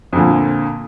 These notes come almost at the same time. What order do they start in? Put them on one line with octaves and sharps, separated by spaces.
F2 D3 A#2